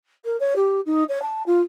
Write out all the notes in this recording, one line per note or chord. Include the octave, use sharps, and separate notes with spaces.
A#4
C#5
G4
D#4
C#5
A5
F4